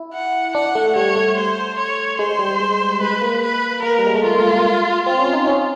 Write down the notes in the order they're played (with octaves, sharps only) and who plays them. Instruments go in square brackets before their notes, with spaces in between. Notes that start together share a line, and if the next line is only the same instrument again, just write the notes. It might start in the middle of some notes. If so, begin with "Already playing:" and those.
Already playing: [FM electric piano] E4
[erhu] F#5
[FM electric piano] D4 [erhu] F#5
[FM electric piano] A3
[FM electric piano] G3 [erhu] C#5
[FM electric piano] A3
[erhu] C5
C#5
[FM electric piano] G#3 [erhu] C5
[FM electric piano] G3
G#3
[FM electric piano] G#3 [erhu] B4
[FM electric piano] A#3
[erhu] B4
[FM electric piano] A#3 [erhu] A#4
[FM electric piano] G3
G#3
A3
[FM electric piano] A#3 [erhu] F4
[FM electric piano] A3
A#3
[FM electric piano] C4 [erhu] F4
[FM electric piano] C#4
D#4
C#4